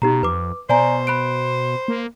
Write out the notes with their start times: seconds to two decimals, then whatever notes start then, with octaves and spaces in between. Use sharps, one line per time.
0.02 B2 D#4 G4 A#5
0.23 F2 B4 D6
0.69 B2 C5 D5 G#5 A#5
1.07 B5 F#6 D7
1.88 A#3